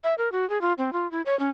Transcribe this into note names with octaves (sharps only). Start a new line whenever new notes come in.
E5
A#4
F#4
G#4
F4
C4
F4
E4
C#5
C#4